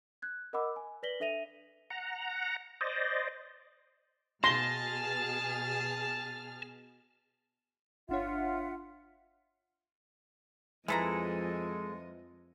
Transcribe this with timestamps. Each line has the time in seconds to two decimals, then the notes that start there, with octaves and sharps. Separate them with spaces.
0.22 F#6 G#6
0.53 A#4 D#5 F#5 B5 D6 E6
0.76 G#5
1.03 B4 D5 A#6 B6 F#7 G7
1.20 D4 A4 E5 A#6 D#7 F7
1.90 F#5 A#5
2.81 C5 D5 D#5
4.44 B2 G#4 A5 C6 F6 A#6
8.09 G1 D4 F4 C#5 E5 F#5
10.88 F2 E3 F3 G#3 A4 B4 D#5 A#5